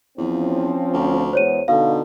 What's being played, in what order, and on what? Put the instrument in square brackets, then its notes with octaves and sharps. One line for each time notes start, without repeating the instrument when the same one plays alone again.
[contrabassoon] E2 [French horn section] F3 C4 C#4
[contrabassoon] D2
[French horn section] E2 G#3 F#4 [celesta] C5 C#5 D#7
[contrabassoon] B2 [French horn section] D3 D#4 A4 [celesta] F5